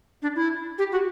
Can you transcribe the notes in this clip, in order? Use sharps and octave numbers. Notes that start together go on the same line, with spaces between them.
D4
E4
G4
F#4